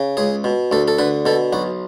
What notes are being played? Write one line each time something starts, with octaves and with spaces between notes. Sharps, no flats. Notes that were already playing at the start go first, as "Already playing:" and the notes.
Already playing: C#3
C#2 G#4
B2
D2 A4
A4
D3 B4
B2 A4
B1 F#4